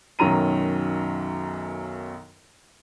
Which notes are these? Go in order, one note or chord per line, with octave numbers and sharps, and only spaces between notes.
B1 F#2 D#3 F#3 A#5 D#7